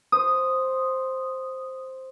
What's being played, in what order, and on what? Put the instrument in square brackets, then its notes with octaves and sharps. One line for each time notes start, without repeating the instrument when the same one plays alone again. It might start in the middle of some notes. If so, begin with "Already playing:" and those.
[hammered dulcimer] C5 [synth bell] D#6